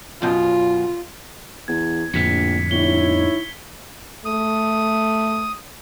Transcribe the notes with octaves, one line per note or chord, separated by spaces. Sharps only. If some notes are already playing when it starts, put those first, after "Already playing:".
F#2 B2 F4
E2 G#6
A#1 F2 A2 D3 B6 C#7
G1 D#4 E4 C#5 G7
A3 D#6